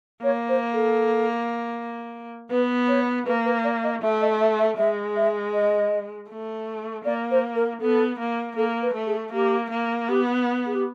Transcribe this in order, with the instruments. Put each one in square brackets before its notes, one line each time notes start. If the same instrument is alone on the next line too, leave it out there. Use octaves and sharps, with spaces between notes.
[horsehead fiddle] A#3 [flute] C#5
[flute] C5
A4
[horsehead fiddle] B3 [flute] B4
[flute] C#5
[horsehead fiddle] A#3 [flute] B4
[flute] B4
D5
D#5
[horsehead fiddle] A3 [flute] E5
[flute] D#5
E5
E5
[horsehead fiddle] G#3 [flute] E5
[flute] E5
D#5
[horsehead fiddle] A3
[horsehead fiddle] A#3 [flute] D5
[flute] C5
A#4
[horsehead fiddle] B3 [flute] A4
[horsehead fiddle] A#3
[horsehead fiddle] A#3 [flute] A4
[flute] B4
[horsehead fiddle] A3
[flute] G#4
[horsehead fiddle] A#3 [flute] G4
[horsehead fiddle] A#3
[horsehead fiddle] B3 [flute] G4
[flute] G#4
G4